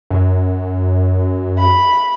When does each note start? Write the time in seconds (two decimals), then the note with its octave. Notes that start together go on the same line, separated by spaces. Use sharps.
0.10 F#2
1.58 B5